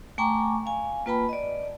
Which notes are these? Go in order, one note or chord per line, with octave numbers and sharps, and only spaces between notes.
A3 G5 G#5 A#5 C#6 D6
F5 G#5
A#3 F4 B4 G5 A5 B5
D5 D#5